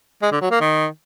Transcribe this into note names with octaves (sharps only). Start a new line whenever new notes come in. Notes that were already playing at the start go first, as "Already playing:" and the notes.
G#3
D3
F#3
A#3
D#3